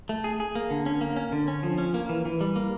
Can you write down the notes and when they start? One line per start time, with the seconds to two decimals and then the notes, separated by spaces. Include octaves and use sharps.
0.09 A3
0.24 G#4
0.40 G#4
0.55 A#3
0.70 D3
0.86 C#4
1.01 A#3
1.17 C#4
1.32 D3
1.48 C#4
1.63 F3
1.78 C#4
1.94 A#3
2.09 E3
2.25 E3
2.41 G3
2.56 A#3